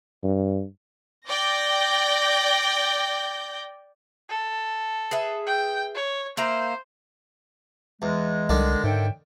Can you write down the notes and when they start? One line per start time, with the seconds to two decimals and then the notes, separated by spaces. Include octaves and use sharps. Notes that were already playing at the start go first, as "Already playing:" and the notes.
0.24 G2
1.29 D5 G5 G6 A#6
4.29 A4
5.11 G#4 B4 E5
5.46 G5
5.95 C#5
6.37 A#3 E4 C5 A#5
8.02 E2 G#3
8.49 C2 D3 D#3 D4
8.84 G#2 C#5 E5 G5